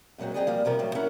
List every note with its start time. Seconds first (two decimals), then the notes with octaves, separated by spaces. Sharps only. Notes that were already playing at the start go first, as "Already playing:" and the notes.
0.18 F#2 A#2 F#3 G#3 C4
0.34 F#3 C4 G4 G#4 D5 D#5
0.47 F3 G3 A#3
0.65 E2 C3 F3 A#4
0.79 A2 F3 F#3
0.95 C#4 E4 A#4 E5 F#5